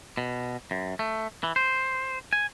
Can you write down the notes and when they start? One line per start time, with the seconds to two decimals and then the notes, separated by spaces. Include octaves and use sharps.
0.17 B2
0.71 F#2
0.99 A3
1.43 E3
1.56 C5
2.33 G#5